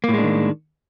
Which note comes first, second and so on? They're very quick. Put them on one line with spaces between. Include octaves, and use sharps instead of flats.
A#3 A2 G#3 D4 D#3